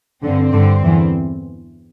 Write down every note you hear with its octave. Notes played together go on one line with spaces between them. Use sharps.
G2 D3 C4
G2 D3
E2 E3